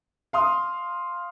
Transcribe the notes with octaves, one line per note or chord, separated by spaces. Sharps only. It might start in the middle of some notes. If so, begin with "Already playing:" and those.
F5 C6 D#6